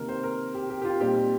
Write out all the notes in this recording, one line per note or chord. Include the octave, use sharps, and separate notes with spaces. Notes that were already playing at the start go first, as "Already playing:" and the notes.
Already playing: C3 D#3 A#3 A#4
C5
A#4
G4
G4
G4
F4
A#2 G3 C4 D#4 G4